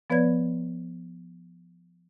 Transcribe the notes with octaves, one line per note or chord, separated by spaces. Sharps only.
F3 B3 B4 C#5 D5 G#6